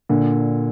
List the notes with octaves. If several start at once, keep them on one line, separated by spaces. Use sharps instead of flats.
A#2 D3